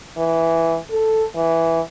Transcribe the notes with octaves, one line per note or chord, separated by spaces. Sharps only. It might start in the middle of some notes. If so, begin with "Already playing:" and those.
E3
A4
E3